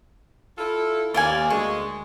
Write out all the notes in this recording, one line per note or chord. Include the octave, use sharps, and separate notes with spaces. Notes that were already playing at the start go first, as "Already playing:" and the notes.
E4 F4 A4
D#2 A#3 D5 F5 G#5
D2 G#3 C#6